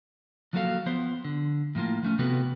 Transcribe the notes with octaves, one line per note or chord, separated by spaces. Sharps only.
F3 F#3 A#3 F#4 A4 F5
F3 B3 C5
D3
A2 F3 A#3 F4
F3 A3 C#4
C3 F3 B3 F#4 A4 B4